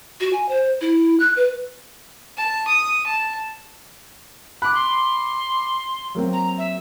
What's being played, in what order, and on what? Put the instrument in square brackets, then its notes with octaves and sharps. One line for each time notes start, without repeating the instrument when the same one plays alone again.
[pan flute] F#4
G#5
C5
E4
F#6
B4
[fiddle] A5
D#6
A5
[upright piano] B5 D6 [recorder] F#6
[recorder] C6
[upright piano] F#3 A#3 C4
[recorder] A#5
E5